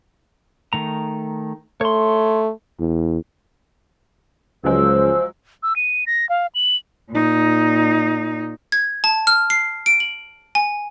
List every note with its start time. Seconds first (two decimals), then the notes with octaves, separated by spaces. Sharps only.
0.73 D#3 A3 A#5
1.81 A3 C#5 C6
2.80 E2
4.64 C#2 F3 F#3 G#3 C5 E6
5.63 E6
5.76 D#7
6.07 A#6
6.29 F5
6.55 F#7
7.11 A#2 D#4
8.72 G#6
9.04 A5
9.27 F6
9.50 C7
9.86 D7
10.00 F#7
10.55 G#5